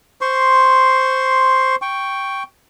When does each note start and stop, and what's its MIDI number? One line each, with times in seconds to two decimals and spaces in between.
0.21 1.76 72
0.21 1.76 84
0.21 1.76 85
1.82 2.43 79
1.82 2.43 85